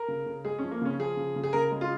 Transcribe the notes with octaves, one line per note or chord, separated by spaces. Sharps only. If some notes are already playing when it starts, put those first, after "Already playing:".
Already playing: A#4
C#3
C#3
G#3 G#4
C#4
F3
A#3
C#3 C#4
F3 G#4
C#3
C#3
G#4
C#3 A#4
G#3
F4